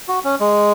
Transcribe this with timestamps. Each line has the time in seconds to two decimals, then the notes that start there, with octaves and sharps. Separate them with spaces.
0.08 F#4
0.24 C#4
0.40 G#3